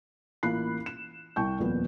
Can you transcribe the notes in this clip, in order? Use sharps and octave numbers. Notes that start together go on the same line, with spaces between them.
A1 A#3 F4 B5 F#6 C7
E7
C2 G5 C#6 G6
D#1 F2 A#2 B3